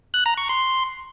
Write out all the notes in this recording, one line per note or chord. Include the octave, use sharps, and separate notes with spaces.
F#6
A#5
C#6
C6